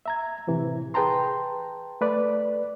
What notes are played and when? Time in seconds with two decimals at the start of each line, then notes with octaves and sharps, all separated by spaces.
0.06 E5 A#5 G#6
0.47 A2 C3 E3
0.94 G#4 B4 G5 A5 A#5 C6
2.01 A3 B4 D5